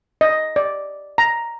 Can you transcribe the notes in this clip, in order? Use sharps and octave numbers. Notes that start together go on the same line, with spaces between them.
D#5
D5
A#5